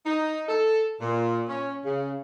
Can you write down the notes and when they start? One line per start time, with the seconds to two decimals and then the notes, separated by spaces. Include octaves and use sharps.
0.06 D#4
0.48 A4
1.01 A#2
1.48 C#4
1.85 C#3